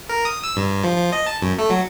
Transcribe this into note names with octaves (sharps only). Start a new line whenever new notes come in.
A#4
D#6
E6
G2
F3
F3
D#5
A5
F#2
A3
F#3